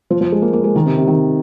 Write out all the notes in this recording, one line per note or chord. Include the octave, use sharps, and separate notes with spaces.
F3
F3
G#3
A#3
A#3
G#3
D#3
C3
C3
D#3